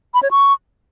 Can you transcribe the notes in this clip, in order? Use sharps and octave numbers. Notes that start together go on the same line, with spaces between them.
B5
C#5
C#6